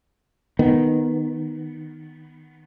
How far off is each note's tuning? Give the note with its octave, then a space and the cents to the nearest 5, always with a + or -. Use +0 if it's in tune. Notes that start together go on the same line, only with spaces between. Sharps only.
D#3 +0 B3 +0